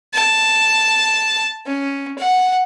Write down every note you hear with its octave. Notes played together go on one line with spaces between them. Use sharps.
A5
C#4
F#5